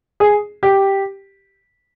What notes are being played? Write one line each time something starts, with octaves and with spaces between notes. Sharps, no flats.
G#4
G4